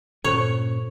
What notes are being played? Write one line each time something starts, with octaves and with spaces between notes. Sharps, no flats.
G2 A#2 C#4 A4 C5 C#5